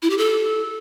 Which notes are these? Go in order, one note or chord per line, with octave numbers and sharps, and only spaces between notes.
E4
G4
A4